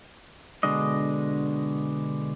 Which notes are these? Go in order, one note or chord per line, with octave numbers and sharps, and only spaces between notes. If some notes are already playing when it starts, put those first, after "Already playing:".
B2 D3 G#3 D4 D#5